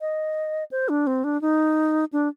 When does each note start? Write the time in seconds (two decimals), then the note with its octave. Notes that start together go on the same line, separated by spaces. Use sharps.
0.01 D#5
0.71 C5
0.89 D4
1.07 C4
1.24 D4
1.42 D#4
2.13 D4